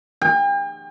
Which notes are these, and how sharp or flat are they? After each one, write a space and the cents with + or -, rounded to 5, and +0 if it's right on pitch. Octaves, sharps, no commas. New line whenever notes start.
G5 +40